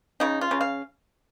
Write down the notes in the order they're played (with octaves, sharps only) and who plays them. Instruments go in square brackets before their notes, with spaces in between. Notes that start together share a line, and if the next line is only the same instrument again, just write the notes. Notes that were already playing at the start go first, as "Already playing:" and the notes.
[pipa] C#3 D#4
F4
C#3
F5